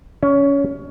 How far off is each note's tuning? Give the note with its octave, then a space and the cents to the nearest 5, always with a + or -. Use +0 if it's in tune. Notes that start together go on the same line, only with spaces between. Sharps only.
C#4 +20